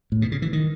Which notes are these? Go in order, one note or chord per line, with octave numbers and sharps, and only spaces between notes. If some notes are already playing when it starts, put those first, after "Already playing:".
A2
B2
C#3
E3
D#3